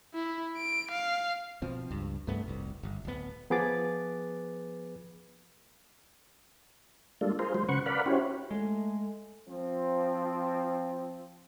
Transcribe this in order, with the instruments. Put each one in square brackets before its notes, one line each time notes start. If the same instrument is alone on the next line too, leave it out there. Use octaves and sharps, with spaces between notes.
[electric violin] E4
D7
F5
[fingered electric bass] B2 F3 C4
C#2 G2
C2 G2 A3 B3
F1 C2
G1
D1 B3
[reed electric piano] F3 B3 G#4 B4 D6 A6
[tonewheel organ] G3 G#3 A#3 D4 F4 A4
F4 G#4 A#4 C5
F#3 G#3 C5
C#3 B4 C5 F#5 C#6
A#4 B4 D5 F5 F#5 B5
C#4 E4 F#4 G4 C5 C#5
[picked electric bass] G#3 [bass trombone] A3
[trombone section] F3 C4